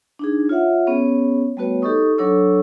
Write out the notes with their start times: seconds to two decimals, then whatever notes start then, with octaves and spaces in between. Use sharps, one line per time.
0.19 D4 D#4 G#4
0.49 F4 C#5 E5 F#5
0.87 B3 C#4 G#4 C#5
1.57 G3 A3 B3 F#4 B4 C#5
1.82 D#4 G4 A4 D#5 C#6 D#6
2.18 F#3 D4 A4 C#5 C#6 E6